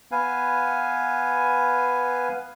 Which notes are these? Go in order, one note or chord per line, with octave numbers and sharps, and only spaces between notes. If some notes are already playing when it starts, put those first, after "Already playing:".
B3 B4 F5 G#5